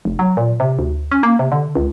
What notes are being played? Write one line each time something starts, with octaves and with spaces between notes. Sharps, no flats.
F1
F#3
A#2
C3
D2
C#4
A#3
C3
D3
C#2